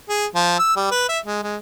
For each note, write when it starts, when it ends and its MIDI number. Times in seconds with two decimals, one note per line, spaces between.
0.09 0.26 68
0.35 0.57 53
0.59 0.75 88
0.76 0.87 55
0.91 1.04 71
1.09 1.19 76
1.25 1.41 56
1.43 1.56 56